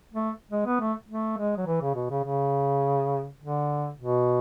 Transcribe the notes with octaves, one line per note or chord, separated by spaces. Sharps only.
A3
G#3
B3
A3
A3
G#3
F#3
E3
C#3
B2
C#3
C#3
D3
B2